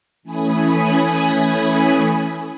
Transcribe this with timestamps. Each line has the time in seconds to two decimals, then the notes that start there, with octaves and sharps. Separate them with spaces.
0.23 E3 A3 C#4 G#5 B5 D#6